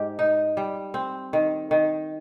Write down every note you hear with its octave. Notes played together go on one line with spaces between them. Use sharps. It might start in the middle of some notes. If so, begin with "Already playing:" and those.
Already playing: G#2 G4
D#4
G3
C4
D#3
D#3